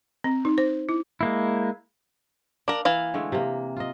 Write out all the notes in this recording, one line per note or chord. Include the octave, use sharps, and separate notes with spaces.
C4
D#4
C5
E4
G#3 A#3 E4
A#3 D4 A#4
E3 F5
D3 G#3 A3
C3 A#3
F4 D#5